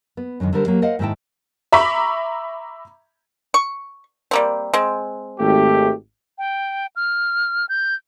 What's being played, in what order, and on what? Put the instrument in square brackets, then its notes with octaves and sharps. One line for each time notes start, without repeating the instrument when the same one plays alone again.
[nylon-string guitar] B3
F#2 A2 D3 D#3
D3 G3 A#4 C5
F#3 A#3 G4
A#4 C5 D#5 F5 F#5
G#2 D#3 D#4 E4 G5 A5
[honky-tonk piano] E5 A#5 B5 C#6 D6 B6
[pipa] C#6
G3 A#3 C4
G#3 C4
[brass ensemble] G#1 A3 G4
[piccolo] G5
F6
G6